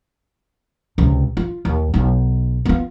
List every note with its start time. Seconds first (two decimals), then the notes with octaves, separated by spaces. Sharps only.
0.98 C#2 C3
1.37 F4
1.65 D#2
1.94 B1 D#4
2.65 B3 F4